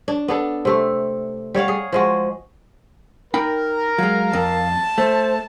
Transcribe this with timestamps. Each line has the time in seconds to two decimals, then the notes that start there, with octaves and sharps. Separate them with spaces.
0.08 D4
0.28 B3 D4 A4
0.65 C3 A3
1.54 G3 C#5 F5 F#5
1.68 G#4
1.92 F3 G#3 F#4
3.34 D#4 A#4 G5 B5
3.98 F#3 G#3 F5
4.33 F2 A5
4.98 A3 C5